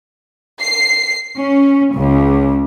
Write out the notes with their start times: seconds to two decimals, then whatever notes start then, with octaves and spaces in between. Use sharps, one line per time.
0.60 C7
1.37 C#4
1.94 C#2